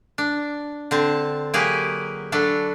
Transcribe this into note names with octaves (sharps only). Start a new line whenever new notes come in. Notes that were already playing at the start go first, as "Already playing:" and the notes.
D4
D3 C4 A5
F#3 A#3 G4 G#4 A#4 B4
F#3 D4 A4 B4